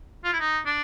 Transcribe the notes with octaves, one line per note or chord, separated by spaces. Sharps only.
F4
E4
D#4
D4